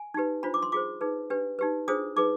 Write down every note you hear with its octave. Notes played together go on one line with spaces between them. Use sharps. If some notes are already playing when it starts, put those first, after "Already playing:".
Already playing: G#5
D#4 G4 B4
D4 F4 C5 B5
D6
C6
F4 G#4 C5 D6
D#4 G#4 B4
D4 G4 B4
D#4 G4 B4
D4 F4 G#4 C5 D#6
D#4 G#4 B4 D6